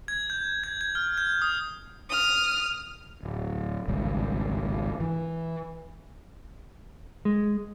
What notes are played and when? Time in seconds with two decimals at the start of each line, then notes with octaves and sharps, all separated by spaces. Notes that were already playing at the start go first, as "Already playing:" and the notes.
0.08 G#6
0.30 G6
0.64 G#6
0.81 G#6
0.95 F6
1.18 G6
1.42 D#6
2.09 D#6 F6
3.23 D1
3.88 G#1 C#2 G2
5.00 E3
7.25 G#3